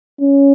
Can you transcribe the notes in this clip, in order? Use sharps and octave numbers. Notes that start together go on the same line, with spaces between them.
C#4